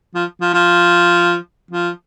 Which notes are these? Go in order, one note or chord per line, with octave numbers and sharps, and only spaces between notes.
F3
F3
F3
F3